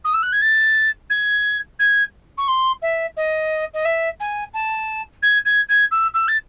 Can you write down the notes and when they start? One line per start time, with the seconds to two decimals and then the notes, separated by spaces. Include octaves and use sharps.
0.04 D#6
0.13 E6
0.22 F#6
0.32 G#6
0.41 A6
1.10 G#6
1.79 G#6
2.37 C#6
2.47 C6
2.82 E5
3.16 D#5
3.73 D#5
3.85 E5
4.19 G#5
4.53 A5
5.22 G#6
5.45 G#6
5.69 G#6
5.91 E6
6.14 E6
6.28 A6